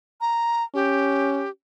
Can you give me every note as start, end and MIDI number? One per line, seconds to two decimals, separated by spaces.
0.21 0.64 82
0.74 1.43 61
0.74 1.50 67